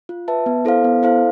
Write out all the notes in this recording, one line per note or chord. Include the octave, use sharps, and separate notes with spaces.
F4
B4 E5 A5
B3
E4 A4 C5 F5
B3
E4 A4 C5 F5